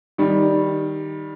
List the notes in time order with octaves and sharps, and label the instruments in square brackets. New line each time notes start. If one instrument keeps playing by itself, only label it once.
[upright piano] D#3 G3